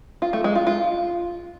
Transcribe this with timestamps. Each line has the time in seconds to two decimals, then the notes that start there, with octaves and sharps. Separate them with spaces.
0.22 F4
0.33 A3
0.44 G#3
0.55 F4
0.67 F4